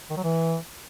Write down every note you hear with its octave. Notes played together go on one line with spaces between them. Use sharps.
D#3
F#3
E3